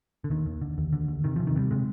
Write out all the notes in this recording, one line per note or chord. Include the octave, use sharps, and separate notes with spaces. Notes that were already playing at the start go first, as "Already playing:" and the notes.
D3
D#2 D#3
D#2
D3
D#2
D3
D#2
C3 D#3
C3 F3
D#3
C3 G3
C3 G#3